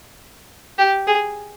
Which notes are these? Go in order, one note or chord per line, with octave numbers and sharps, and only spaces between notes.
G4
G#4